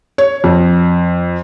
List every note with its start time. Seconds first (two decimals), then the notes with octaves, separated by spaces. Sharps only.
0.18 C#5
0.44 F2